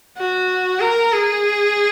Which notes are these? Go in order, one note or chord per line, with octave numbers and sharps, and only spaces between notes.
F#4
A#4
G#4